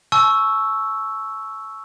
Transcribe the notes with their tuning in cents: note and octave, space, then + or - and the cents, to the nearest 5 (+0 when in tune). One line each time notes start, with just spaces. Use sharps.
A5 -40 C#6 +0 E6 +0